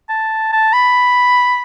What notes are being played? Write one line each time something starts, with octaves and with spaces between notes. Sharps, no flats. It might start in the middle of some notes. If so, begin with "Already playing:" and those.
A5
A5
B5